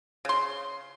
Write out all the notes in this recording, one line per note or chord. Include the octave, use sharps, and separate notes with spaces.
C#3 C6